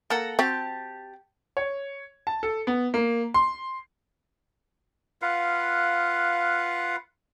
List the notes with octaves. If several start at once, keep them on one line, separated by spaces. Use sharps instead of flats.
A#3 A4 F#5 A#5
C4 F#4 G4 A5
C#5
A5
A4
B3
A#3
C6
F4 B4 F5 F#5